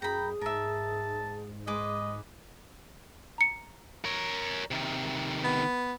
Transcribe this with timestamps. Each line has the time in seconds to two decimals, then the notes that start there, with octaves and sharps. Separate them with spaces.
0.02 F#2 G#4 G5 A#5 B5
0.41 G#2 A#4 E5 A5
1.67 G#3 G#4 B4 D#5 D6
3.38 A#5 C#7
4.05 A#4 C#5
4.71 C3 D#3
5.44 B3